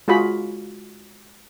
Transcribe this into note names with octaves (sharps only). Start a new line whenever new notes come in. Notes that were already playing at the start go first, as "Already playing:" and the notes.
G#3 F4 F#4 G#4 B5